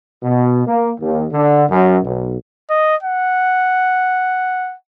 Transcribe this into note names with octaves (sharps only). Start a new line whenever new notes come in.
B2
A#3
D#2
D3
F#2
B1
D#5
F#5